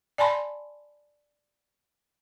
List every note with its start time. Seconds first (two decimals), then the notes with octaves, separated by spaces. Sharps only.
0.18 D5 G#5 A5 B5 C6